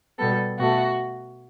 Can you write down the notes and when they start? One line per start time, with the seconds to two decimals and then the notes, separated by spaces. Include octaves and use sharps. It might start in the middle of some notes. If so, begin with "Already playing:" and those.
0.18 B2 G3 B3 A4
0.59 B2 A3 F#4